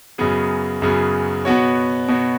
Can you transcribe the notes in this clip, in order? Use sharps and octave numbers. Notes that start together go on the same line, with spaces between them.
F#2 C#3 F#3 B3 G#4
F#2 C#3 F#3 B3 G#4
B2 B3 F#4 C#5
B2 B3 F#4 C#5